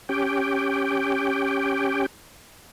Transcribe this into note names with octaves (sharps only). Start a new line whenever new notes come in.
C#4 G4 G5